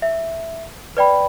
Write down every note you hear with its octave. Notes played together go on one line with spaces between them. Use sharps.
E5
B4 D5 G5 B5